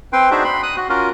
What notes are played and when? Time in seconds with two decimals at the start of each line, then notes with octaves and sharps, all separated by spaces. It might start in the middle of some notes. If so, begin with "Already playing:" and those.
0.13 C4 B4 G5 C6
0.31 D4 D#4 F#4 G#4 C5 E5
0.44 B5 C6
0.63 D#6 F#6
0.76 F#4
0.89 C#4 F4 F#4 A#4